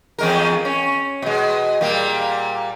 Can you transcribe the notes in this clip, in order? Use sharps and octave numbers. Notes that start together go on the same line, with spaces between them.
E2 G#3 A#4
C#4
B2 G#3
A#2 G3 A#3